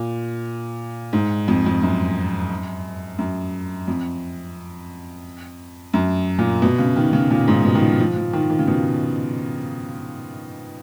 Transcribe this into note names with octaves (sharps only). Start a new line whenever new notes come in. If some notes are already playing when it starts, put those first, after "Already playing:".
Already playing: A#2
G#2
F2
F2
F#2
F#2
F2
F#2
A#2
B2
C#3
D#3
C#3
A#2
G#2
B2
D#3
F3
F3
F3
D#3
D#3
C#3
B2